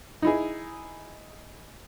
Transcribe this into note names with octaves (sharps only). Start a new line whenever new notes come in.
D#4 E4 G#4